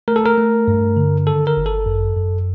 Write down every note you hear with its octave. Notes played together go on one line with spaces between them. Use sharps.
A3 A#4
A4
A#4
A3
G2
D3
D#3 A4
A#4
G1
A4
F#2
F#2